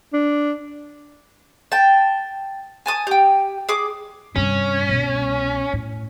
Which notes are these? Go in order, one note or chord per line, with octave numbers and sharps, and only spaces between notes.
D4
G5 A5
G#5 A5 D#6
G4 G5
G#4 D6
G2 C3 C#4
C2 B2
A2